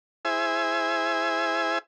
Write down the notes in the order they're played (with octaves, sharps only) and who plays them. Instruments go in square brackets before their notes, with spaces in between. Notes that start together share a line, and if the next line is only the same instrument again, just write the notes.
[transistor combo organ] E4 G#4 C5 E5 G#5